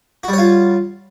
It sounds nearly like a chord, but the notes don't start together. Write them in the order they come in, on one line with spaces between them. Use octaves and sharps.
F#4 G3 C#5 F4